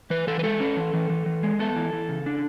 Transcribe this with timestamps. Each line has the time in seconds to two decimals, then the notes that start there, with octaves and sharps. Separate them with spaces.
0.10 E3 B4
0.27 E3 A4
0.39 B4
0.43 G#3 A4
0.60 C#4
0.77 E3
0.94 E3
1.09 E3
1.26 E3
1.43 G#3
1.59 B3 A4
1.76 E3
1.93 E3
2.09 C#3
2.26 D4